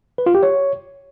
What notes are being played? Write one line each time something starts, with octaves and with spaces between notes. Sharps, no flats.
B4
F4
G4
C#5